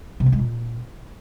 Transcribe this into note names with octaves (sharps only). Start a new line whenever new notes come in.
C3
A#3
G#3
A#2